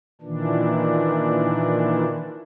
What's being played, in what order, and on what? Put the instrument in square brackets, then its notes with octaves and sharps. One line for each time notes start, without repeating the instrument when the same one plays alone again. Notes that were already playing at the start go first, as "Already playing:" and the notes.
[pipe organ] A#2 D#3 E3 D4